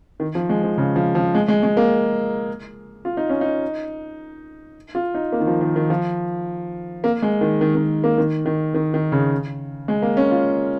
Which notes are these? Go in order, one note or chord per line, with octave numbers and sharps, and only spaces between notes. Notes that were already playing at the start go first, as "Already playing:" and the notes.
D#3
F3
G#3
F3
C#3
F3
F3
G#3
G#3
G#3
A#3
F4
D#4
C#4
D#4
F4
D#4
A#3
D#3
F3
D#3
D#3
F3
A#3
G#3
D#3
D#3
D#3
A#3
D#3
D#3
D#3
D#3
C#3
G#3
A#3
C#4
F4